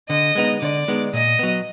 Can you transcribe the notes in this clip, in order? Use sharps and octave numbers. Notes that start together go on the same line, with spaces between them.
D3 D#5
G#3 B3 D#4
D3 D5
G#3 B3 D#4
A#2 D#5
F#3 B3